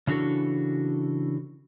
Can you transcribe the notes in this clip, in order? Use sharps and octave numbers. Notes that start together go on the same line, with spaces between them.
C#3 E3 D4 F#4 A4